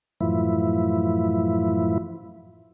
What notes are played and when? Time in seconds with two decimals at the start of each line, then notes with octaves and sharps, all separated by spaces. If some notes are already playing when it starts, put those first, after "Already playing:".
0.21 F#2 A2 E3 F3 E4